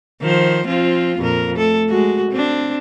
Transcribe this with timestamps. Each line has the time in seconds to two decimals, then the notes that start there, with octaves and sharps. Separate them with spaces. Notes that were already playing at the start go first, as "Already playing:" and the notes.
0.21 D#3 F3 C5
0.68 F3 C4 F4
1.19 F2 A#2 A#4
1.56 A3 A4
1.89 G#3 F#4
2.31 C4 D4